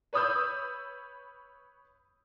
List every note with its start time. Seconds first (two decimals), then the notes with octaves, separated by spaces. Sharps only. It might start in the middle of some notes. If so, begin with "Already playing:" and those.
0.13 B4 C#5 B5 D#6 E6 G6